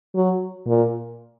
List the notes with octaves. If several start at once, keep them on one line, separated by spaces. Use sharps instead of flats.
F#3
A#2